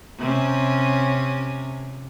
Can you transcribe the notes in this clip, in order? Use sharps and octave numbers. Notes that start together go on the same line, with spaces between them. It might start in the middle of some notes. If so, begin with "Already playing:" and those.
C3 C#4